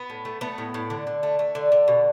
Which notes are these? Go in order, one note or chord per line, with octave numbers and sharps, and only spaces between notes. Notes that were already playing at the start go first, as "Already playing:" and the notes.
Already playing: B3
A2
A3
A3 B3
A2
A2
D3
D3
A3
A3
D3
D3
B2